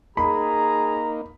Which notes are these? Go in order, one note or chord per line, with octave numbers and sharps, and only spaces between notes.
A#3 D#4 G#4 A#5 B5